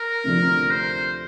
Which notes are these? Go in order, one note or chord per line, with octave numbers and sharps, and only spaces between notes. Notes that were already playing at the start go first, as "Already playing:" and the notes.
Already playing: A#4
D2 C3 F3 D4
C5